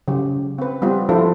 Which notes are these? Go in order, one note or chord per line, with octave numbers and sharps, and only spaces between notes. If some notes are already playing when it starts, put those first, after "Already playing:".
C#3 F#3 G4
C4 B4
G3 B3 C4 F4
F3 D4 E4 F4 A4 C5